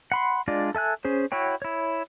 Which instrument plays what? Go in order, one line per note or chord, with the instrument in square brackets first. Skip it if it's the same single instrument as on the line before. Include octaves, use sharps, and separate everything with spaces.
[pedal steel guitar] F#5 B5 C6
G#3 D4 F4 D5
A4 E5 G#5 F#6
C#4 G#4 C5
E4 F#4 C#5 G5
E4 C#5